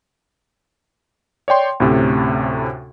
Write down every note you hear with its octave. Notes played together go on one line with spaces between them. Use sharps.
C#5 D5 G5 C6
D2 A2 C3 C#4